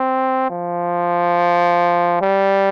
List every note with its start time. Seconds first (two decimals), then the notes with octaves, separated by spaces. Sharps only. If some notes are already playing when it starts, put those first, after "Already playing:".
Already playing: C4
0.50 F3
2.21 G3